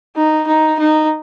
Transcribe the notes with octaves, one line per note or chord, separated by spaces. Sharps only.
D#4
D#4
D#4